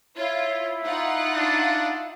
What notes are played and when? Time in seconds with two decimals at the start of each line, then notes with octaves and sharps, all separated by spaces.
0.17 E4 F4 C#5
0.85 D#4 F4 F5 F#5
1.36 D4